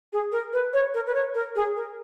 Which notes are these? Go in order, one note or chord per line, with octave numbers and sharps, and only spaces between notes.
G#4
A#4
B4
C#5
A#4
B4
C#5
A#4
G#4
A#4